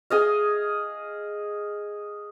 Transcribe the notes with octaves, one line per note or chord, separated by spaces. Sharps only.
G#4 D#5 F5